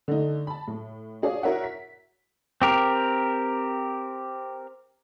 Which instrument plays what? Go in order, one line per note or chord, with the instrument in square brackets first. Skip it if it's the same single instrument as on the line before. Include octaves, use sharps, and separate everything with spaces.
[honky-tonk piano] D3 A3 D#4
A5 B5
A2
D4 G#4 C#5 D5 F5
E4 F#4 A#4 C#5 E5 F#5
B6
[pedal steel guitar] C4 G4 A#4